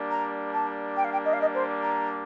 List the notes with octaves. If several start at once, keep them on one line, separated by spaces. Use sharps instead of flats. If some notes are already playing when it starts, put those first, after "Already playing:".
Already playing: G3 A#3 D4
A#5
A5
G5
F5
G5
D#5
F5
D#5
C5
A#5